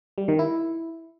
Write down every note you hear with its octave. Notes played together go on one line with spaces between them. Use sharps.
G3
D#3
E4